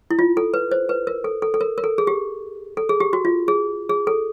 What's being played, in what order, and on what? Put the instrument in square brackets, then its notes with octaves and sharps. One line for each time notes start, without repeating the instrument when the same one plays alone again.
[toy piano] E4
F4
A4
B4
C5
B4
A#4
A4
A4
A4
A#4
A#4
A4
G#4
G4
A4
G#4
G4
F#4
F4
G#4
G#4
A4